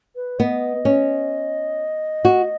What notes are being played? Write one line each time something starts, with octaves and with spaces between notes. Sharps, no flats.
B4
B3 D#5
C#4
F#4